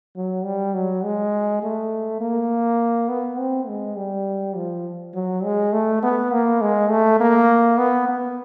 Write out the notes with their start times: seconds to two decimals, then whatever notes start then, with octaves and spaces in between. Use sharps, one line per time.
0.16 F#3
0.44 G3
0.74 F#3
1.04 G#3
1.63 A3
2.21 A#3
3.09 B3
3.39 C4
3.67 G#3
3.97 G3
4.56 F3
5.15 F#3
5.44 G#3
5.73 A3
6.03 B3
6.32 A#3
6.62 G#3
6.91 A3
7.21 A#3
7.78 B3
8.09 B3